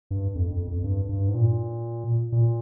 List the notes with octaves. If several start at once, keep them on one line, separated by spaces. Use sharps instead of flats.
G2
F2
F2
F2
G2
G2
G#2
A#2
A#2